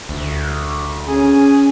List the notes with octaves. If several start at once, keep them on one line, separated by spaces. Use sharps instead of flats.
D2
C#4 G#4